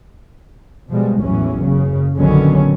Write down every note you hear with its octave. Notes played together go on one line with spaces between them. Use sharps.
B2 F3 G3 G#3
A1 E2 E3 F#3 C#4
F#1 C#3
A#1 D3 D#3 F#3 B3 C#4